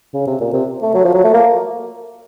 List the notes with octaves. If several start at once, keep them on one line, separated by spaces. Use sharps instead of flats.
C#3
C3
A#2
C3
A3
F#3
F3
F#3
A3
A#3